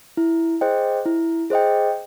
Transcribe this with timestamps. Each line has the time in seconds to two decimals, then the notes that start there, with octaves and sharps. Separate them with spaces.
0.17 E4
0.61 G#4 C5 D#5 G5
1.05 E4
1.50 G#4 C5 D#5 G5